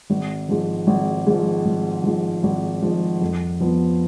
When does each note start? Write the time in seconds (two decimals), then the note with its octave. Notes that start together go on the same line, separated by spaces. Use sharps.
0.10 G#1
0.49 G#2 F3
0.87 G#1
1.27 G#2 F3
1.65 G#1
2.04 G#2 F3
2.43 G#1
2.82 G#2 F3
3.22 F2
3.60 F3 B3